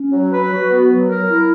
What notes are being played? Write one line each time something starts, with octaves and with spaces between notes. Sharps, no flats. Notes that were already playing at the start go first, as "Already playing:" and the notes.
Already playing: C#4
F#3
B4
F#4
B3
F#3
A#4
E4